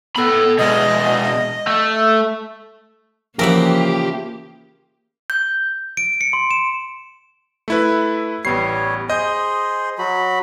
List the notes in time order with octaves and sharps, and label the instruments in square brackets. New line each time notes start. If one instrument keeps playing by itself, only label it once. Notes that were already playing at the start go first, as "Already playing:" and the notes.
[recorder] B3 [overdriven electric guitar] A4 B5
[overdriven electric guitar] B2 G#3 [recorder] D#5
[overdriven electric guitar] A3
[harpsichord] C#3 E3 F3 [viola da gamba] A#3 [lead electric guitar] G4 [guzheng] A#4 E5 F#5
[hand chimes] G6
[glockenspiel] D7
C#7
C6
E7
[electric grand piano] A3 E4 B4
[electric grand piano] A1 B3 C7 [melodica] G3 C#5
[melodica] G#4 C5 [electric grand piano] D#5 G6
[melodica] F#3 F#4 B5